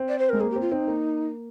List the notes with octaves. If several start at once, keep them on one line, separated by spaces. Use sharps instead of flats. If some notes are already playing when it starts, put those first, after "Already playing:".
Already playing: C4
D5
C5
G#3 A#4
A#3 G#4
G4
C4
F4
C4 D#4
A#3